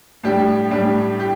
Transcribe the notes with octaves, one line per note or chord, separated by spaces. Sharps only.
A2 G3 D4 G4
A2 G3 D4 G4
G4